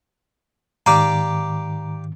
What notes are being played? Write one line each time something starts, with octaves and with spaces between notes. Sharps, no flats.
G#2 D#3 G4 D5 F5 A#5